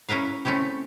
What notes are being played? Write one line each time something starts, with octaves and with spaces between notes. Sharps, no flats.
C#4 E4 A#4 B4 F5
A3 C4 C#4 E4 G4